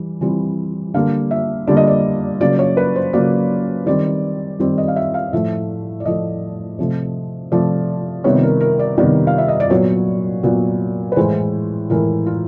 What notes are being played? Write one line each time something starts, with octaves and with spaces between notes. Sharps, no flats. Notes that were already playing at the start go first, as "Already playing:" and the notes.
Already playing: E3 G3
E3 G3 C4
D3 G3 A#3 F5
E5
D3 G3 A#3 D5
D#5
D5
C#3 F#3 A#3 D5
C#5
B4
C5
C#3 F#3 A#3 D5
D#3 G3 C4 D5
D#3 G3 C4 D5
D#5
F5
E5
F5
A2 F3 A3 E5
D5
A2 F3 A3 D#5
C3 F3 A3
C3 F3 A3 D5
C3 D#3 G3 B3 C#5
A#4
A#4
D5
C3 D#3 G3 B3 D5
F5
E5
D#5
D5
A#2 F#3 B3 C#5
A#2 F#3 B3
B4
A2 E3 G#3 C5
A2 E3 G#3 A#4
F4